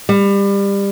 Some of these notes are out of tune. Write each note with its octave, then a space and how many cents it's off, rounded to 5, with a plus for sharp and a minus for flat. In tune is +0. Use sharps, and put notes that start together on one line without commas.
G3 +25